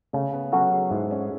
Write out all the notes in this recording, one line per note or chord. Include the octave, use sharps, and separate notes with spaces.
C#3 A3
B3
F#3 C#4 F#4 A4
G#4
G#2 E4
C#4